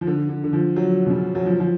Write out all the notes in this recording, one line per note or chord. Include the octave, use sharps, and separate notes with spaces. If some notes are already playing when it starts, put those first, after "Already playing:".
F3
D3
D3
D3
F3
F#3
B2
C#3
F#3
F3
F3